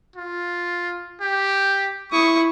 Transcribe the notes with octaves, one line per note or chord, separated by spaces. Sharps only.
F4
G4
E4 C#6 D#6